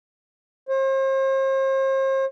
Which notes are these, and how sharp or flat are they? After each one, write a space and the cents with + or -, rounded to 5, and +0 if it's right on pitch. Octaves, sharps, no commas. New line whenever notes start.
C5 +40